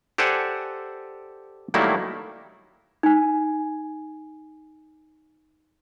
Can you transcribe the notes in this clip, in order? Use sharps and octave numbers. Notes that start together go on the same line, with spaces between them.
G4 A4 C5 D5 F#5 G#5
D#3 F#3 G3 A3 A#3 E4
D#4 G#5